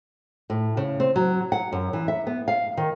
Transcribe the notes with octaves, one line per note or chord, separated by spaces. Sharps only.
A2
C#3
C4
F#3
F#5
F#2
E3
E5
B3
F5
D#3